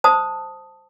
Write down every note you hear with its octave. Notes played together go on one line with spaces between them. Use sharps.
C5 A5 D#6